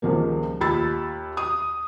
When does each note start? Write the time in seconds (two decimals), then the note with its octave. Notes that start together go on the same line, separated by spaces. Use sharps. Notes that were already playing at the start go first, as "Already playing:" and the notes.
0.02 C#2 D#3 F3 G3 A#3
0.61 D#2 F4 B5 E6 A6
1.37 D#6